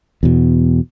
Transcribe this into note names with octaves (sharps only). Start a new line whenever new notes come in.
E2 B2